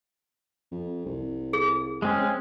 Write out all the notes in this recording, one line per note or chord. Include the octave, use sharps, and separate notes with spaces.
F2
C2
G#4
G#3 C4 C#4